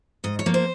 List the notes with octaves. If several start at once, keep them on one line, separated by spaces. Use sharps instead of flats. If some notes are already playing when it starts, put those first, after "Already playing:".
G#2 D#5
C#5
F3 A#3
C5